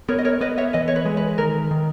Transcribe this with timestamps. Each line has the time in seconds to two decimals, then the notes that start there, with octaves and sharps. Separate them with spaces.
0.08 B3 A#4 C#5
0.18 D#5
0.25 A#4 C#5
0.41 B3 B4 D#5
0.58 C#5 E5
0.73 E3 B4 D#5
0.88 C#5
0.96 B4
1.05 G#3
1.17 B4
1.38 D#3 A#4
1.71 D#3